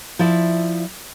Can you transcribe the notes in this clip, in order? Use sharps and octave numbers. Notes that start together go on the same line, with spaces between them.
F3 E4 D5 E5